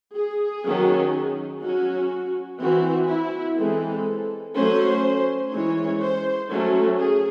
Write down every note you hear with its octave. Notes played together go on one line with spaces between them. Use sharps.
G#4
D#3 F#3 C#4
F#3 C#4 F#4
E3 C4 F#4
E4
E3 G#3 C4 A4
F#3 A3 C#4 C5
E3 G#3 C#4 C#5
C5
F#3 A3 C#4
G#4